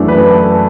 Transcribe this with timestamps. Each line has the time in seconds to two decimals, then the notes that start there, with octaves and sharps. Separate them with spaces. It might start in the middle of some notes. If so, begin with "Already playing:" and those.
Already playing: F#2 E3 A3 D4
0.08 B4
0.31 A4